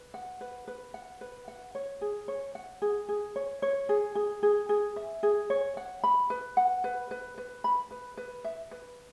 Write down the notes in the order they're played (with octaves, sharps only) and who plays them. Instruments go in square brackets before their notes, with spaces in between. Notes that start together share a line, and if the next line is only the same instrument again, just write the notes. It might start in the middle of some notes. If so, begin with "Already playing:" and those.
Already playing: [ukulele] B4
F#5
B4
B4
F#5
B4
F#5
C#5
G#4
C#5
F#5
G#4
G#4
C#5
C#5
G#4
G#4
G#4
G#4
E5
G#4
C#5
F#5
B5
B4
F#5
B4
B4
B4
B5
B4
B4
E5
B4